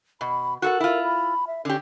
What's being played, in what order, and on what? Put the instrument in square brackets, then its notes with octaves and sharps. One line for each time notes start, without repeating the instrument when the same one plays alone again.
[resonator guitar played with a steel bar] B2 [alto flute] B5
[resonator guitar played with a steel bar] F#4 A4 F#5 [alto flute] A#4
[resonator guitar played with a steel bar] E4 F4
[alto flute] B5
E5
[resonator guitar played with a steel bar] D3 G4 [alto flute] C#4